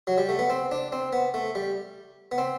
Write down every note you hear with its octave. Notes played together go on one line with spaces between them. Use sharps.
F#3
G3
A3
B3
C4
D4
C4
B3
A3
G3
B3
C4